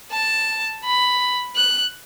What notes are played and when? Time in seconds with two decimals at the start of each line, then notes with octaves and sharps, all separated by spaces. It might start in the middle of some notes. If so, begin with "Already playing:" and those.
0.12 A5
0.84 B5
1.56 F#6